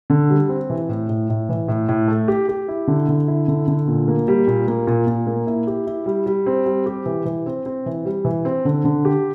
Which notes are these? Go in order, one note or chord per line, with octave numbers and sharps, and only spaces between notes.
D3
G3
C4
E3
A2
A2
A2
E3
A2
A2
A3
G4
G4
E4
D3
D3
E4
D3
D3
A#2
A#3
G3
A#2
A#3
A#2
A#2
A#3
E4
G4
E4
G3
G3
C4
G3
G4
E3
E3
C4
C4
E3
G3
E3
C4
D3
D3
G4